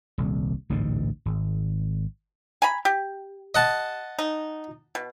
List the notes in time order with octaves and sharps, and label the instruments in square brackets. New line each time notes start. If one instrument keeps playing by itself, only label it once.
[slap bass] D#1 C2
A1 D2 G#2 B2
G#1
[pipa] G#5 A#5 B5
G4
[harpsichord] D#5 F#5 A5
[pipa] D#4
B2